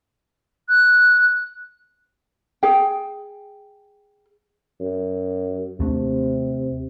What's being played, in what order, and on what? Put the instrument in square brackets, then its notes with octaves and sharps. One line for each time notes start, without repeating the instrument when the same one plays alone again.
[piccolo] F#6
[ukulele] G#4 G5
[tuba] F#2
[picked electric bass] D#2 A3 D4 [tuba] C3